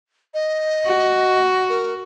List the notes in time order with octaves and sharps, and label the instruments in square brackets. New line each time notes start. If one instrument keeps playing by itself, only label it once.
[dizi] D#5
[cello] F#4
[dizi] A#4